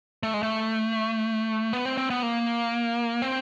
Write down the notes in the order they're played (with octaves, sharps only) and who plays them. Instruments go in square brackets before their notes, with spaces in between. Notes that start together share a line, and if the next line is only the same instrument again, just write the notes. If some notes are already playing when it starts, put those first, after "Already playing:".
[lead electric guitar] A3
G#3
A3
B3
C4
C4
B3
A#3
C4